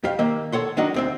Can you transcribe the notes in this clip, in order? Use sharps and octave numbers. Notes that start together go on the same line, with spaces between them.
F2 G4 F5
D#3 A#3 E5
A4 C#5 F#5 C6
D#3 F#3 D4 D#4 F#4
D2 C4 E5